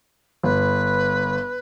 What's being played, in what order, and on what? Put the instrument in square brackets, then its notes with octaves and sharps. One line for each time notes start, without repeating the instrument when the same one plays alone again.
[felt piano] G1 [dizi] B4